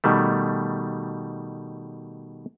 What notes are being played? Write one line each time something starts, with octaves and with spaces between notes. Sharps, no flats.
B2 D#3 G3 A3